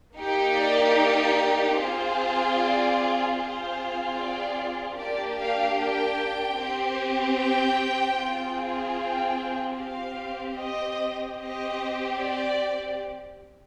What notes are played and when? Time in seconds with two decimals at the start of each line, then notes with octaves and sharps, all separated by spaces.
0.16 A#3 D#4 G4
0.56 D5
0.96 D5
1.76 C4 F4 G#4 C5
2.56 D5
3.37 C4 F4 G#4 C5
4.17 D5
4.97 A#3 D4 G4 D5
5.37 F5
5.78 G5
6.57 C4 G4
7.38 G5
8.18 C4 F4 G#4
8.98 G5
9.78 C4 G4 F5
10.58 D#5
11.38 C4 G4 D#5
12.19 D5